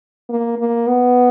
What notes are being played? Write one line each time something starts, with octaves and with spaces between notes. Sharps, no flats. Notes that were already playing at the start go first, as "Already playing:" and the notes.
A#3
A#3
B3